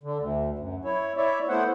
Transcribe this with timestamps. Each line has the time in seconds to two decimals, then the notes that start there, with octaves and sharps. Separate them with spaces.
0.03 D3
0.19 D2
0.59 F#2
0.85 E4 C#5
1.17 E4 C#5 D5 E5
1.49 A3 B3 E4 C5 F#5